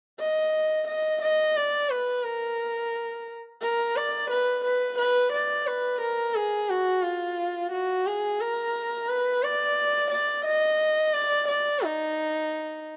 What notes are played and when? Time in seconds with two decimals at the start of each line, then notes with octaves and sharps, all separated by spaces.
0.20 D#5
0.88 D#5
1.22 D#5
1.56 D5
1.90 B4
2.25 A#4
3.62 A#4
3.96 D5
4.31 B4
4.65 B4
4.98 B4
5.33 D5
5.67 B4
6.01 A#4
6.35 G#4
6.69 F#4
7.04 F4
7.72 F#4
8.06 G#4
8.40 A#4
9.09 B4
9.43 D5
10.11 D5
10.45 D#5
11.13 D5
11.48 D5
11.82 D#4